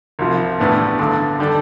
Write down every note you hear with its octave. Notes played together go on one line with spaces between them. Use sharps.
C2 C3 F3
A1 A2 G3 B3 D4
G2 D3 A3 D4
D3 G3 D4 A4